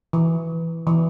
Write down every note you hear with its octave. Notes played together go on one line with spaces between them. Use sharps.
E3
E3